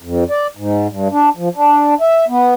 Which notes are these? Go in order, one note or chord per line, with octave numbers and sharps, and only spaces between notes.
F2
D5
G#2
G2
D4
F3
D4
E5
B3